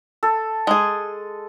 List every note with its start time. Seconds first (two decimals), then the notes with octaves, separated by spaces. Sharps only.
0.23 A4
0.67 G#3 G#4